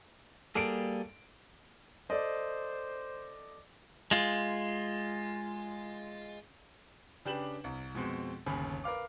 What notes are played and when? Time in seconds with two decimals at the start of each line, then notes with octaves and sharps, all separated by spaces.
0.55 G3 A#3 G#4 A4 D7
2.10 A4 C5 D5 D#5
4.11 G#3 F4
7.25 C#3 D4 G4 B4 E7 F#7
7.64 C2
7.95 F2 B2 G#3 C4
8.46 G1 D#2 C#3 G#5 B5
8.84 A#4 B4 F5 D6